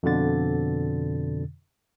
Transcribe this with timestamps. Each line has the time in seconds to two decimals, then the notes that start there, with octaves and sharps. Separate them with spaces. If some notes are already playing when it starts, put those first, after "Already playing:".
0.03 F2 B2 D3 A6